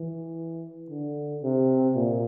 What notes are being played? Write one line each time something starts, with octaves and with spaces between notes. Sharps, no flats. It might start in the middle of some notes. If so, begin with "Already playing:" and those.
Already playing: E3
D3
C3
A#2